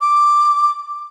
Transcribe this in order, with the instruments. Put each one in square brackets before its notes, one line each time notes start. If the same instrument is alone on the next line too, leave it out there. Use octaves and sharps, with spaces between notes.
[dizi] D6